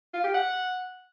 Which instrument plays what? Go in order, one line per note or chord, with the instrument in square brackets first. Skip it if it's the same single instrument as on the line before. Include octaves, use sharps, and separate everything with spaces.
[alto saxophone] F4
G4
F#5